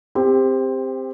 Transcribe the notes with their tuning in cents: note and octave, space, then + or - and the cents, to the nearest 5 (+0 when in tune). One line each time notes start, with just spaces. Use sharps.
C4 +0 G4 +25